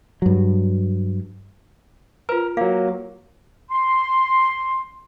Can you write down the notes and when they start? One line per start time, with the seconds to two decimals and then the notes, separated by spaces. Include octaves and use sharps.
0.22 G2 F#3
2.29 F4 A#4 B4
2.57 F#3 A#3 F5
2.88 G4
3.70 C6